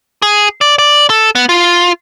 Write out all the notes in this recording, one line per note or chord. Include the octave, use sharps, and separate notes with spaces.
G#4
D5
D5
A4
B3
F4